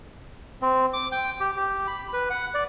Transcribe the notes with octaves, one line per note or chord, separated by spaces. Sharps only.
C4
D6
G5
G4
G4
B5
B4
F#5
D5